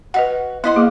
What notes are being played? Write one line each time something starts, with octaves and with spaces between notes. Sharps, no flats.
F#4 B4 D#5 F#5
B3 E4 C5 D#5 F#5 C6
A#3 G#4